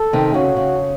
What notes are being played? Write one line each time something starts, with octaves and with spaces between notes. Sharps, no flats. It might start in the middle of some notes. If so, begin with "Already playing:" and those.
Already playing: A4
C3 D#3
C#3 F#4
C#3